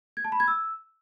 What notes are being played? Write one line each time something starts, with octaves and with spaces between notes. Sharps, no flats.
G#6
A5
B5
G#6
E6